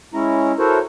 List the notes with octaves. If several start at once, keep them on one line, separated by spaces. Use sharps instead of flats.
G#3 C#4 E4 A#5
E4 F#4 A4 A#4 C5 C#5